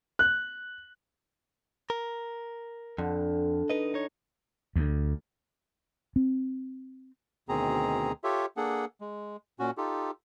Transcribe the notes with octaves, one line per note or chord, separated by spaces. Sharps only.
F#6
A#4
F2 D3
D#4 B4 D#5
D#4 C#5
D2
C4
D2 B2 D#3 C4 G#4 A#5
F4 G4 A4 C#5 E5
A#3 D4 G#4 A4 F#5
G#3
A#2 C#4 F#4
D#4 F4 G4 A4